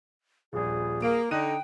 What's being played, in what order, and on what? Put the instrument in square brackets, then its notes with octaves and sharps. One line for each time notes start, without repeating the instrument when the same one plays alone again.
[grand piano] D#1 A#1 [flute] G#4
[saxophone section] A#3 [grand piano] D7
[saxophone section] D3 D#4 [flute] G5 [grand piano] F#6 A#6 D#7